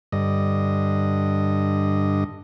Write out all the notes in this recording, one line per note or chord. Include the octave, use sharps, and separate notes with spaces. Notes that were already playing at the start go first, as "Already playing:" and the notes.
G2 D3 D#5